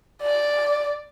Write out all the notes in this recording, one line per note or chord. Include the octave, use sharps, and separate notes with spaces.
D5